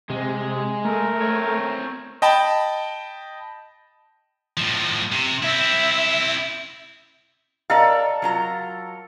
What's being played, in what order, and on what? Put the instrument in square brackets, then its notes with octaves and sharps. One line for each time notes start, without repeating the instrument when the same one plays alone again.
[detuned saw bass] C3 [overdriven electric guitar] G#3
[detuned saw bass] A3 [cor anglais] A#4
[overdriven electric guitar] C4 C#5
[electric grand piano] D#5 G5 A5 B5
[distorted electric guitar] A2 F3
C3
[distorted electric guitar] C4 E4 [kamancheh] E5
[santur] A4 A#4 [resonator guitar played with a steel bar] D5 D#5 F5
[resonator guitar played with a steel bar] F#3 F4 A#5